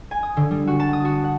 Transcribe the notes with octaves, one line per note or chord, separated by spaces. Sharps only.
G#5
D#6
D3
G3
F#4
A5
D#6
F#4
F#5